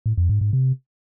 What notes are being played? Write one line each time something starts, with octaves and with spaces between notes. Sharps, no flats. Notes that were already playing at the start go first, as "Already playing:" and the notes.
A2
F2
G#2
G#2
C3